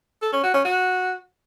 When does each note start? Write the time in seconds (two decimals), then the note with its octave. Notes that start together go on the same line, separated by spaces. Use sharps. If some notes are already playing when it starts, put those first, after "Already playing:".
0.22 A4
0.33 C#4
0.43 F#4
0.54 C#4
0.65 F#4